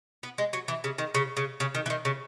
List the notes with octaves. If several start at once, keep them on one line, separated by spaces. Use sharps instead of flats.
B3
G#3
F#3
E3
C#3
D#3
C#3
C#3
C#3
D#3
E3
D#3
C#3